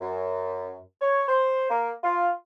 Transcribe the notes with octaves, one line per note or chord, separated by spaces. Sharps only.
F#2
C#5
C5
A#3
F4